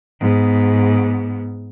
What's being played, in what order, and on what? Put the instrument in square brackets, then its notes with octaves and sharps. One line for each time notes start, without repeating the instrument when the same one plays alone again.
[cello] G#2 B3